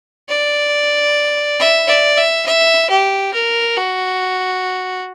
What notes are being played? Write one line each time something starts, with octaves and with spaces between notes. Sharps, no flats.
D5
E5
D5
E5
E5
G4
A#4
F#4